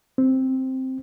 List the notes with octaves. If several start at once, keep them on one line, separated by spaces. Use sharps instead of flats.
C4